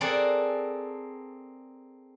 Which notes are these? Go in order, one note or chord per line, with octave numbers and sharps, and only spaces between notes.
A#3 C4 G#4 A4 D5 F#5